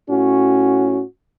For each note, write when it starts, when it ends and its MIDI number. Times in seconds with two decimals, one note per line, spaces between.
0.10 1.02 45
0.10 1.02 61
0.10 1.02 66